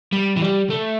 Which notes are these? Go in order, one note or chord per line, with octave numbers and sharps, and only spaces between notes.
G3
E3
G3
A3